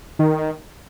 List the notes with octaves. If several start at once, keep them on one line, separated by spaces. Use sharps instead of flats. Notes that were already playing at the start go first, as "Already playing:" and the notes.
D#3